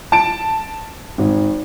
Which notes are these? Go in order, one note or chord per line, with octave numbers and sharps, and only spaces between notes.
A5 D7
G#1